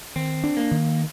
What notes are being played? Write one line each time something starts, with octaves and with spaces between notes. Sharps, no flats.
D#3 C4
D4
A#3
D#3